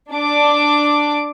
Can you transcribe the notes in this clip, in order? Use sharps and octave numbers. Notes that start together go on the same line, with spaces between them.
D4 D6